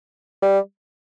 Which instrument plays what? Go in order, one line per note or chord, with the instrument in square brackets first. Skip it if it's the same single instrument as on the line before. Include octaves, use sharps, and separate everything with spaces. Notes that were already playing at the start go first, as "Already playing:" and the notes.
[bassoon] G3